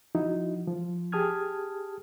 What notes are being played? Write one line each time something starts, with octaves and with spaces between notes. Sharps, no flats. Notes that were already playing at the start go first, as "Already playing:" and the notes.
F3 D#4 E4 F#4
F3
G4 G#4 A5 D#6 F6 G#6